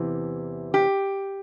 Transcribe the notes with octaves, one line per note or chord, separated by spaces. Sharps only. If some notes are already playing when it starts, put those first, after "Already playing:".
Already playing: E2 C3 E3
G4